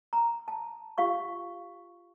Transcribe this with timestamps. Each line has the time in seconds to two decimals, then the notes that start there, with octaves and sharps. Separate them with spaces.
0.13 A#5
0.48 A5
0.98 F4 G4 F5 C#6